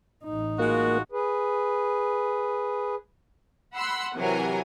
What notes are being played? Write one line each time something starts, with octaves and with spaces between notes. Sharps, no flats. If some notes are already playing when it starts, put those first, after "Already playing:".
A1 D#4
G#3 A#3 F4 F#4
G#4 B4
F#5 B5 C6 E6
C3 E3 F#3 A#4 G#5